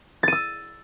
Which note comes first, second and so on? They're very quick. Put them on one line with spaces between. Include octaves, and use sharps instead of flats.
A6 D#7 E6